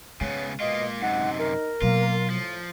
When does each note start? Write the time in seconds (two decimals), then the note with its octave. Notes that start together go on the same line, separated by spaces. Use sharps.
0.21 C#3 G#3 B3 C#5
0.60 B2 A#3 F4 D#5
1.02 F#2 C3 D#4 F#5
1.39 A#4
1.82 B2 F#3 A#3 F4
2.30 A2 F3